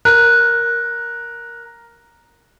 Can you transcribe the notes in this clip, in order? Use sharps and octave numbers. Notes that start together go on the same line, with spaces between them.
A#4 F#6